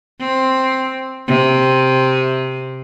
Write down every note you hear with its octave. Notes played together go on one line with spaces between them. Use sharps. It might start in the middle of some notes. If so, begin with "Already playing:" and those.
C4
C3